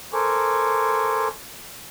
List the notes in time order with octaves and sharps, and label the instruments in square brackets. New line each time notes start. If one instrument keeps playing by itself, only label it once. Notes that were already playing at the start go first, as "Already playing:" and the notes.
[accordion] A4 A#4 C5 G#5 C#6 D6